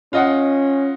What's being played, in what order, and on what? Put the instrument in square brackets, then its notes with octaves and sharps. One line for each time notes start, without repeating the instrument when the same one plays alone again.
[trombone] C#4 [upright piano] F4 D#5 F#5